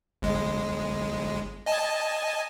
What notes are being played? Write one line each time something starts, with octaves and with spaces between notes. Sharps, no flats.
G1 G#3
D#5 G#5 A5